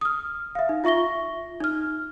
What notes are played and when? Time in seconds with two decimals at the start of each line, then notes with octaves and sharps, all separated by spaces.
0.01 D#6 F6
0.55 E5 F5
0.69 D#4
0.84 F4 E5 C#6 A#6 G7
1.60 D#4 F6